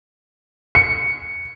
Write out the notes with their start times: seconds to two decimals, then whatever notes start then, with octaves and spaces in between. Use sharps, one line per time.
0.75 C#7